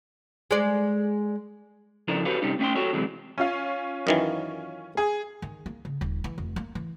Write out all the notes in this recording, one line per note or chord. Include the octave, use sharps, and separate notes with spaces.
G#3 D5
C#3 F3 D4 E4 A4 A#4
F#4 G4 A4 B4 C#5 F5
C3 D#3 G3 C#4 D#4 G4
A3 C#4 E5 F#5 G5 C6
F#4 G4 A4 C#5
E2 C3 E3 F#3 G#3
C#4 F4 F5
F#2 D#3 E3
G#4
D#3
A#3
C#3
D#1
E3
F1
A#3
E3